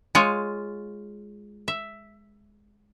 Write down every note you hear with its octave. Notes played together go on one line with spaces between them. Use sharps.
G#3 F4 C#5
E5